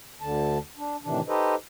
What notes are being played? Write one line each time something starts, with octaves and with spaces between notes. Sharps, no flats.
D2 D3 A5
D4
A2 C3 D#3 E3 D4
D#4 G4 A4 B4 C5 D#5